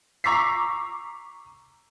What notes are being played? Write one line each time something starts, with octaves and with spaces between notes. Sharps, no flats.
A#5 C#6 D6 E6 B6 C7